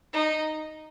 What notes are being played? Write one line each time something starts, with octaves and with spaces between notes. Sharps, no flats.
D#4